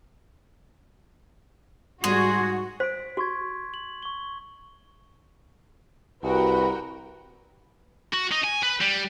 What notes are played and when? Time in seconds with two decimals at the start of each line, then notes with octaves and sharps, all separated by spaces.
2.04 G#2 G3 G#3 F#4 G#4 C6
2.80 C5 B6 D7
3.17 F#4 C6 C#6 G#6
3.74 F#7
4.03 C#6 G7
6.23 C2 F#4 A#4 B4 G5
8.13 F#4
8.31 D#4
8.44 G#5
8.63 B4
8.81 G3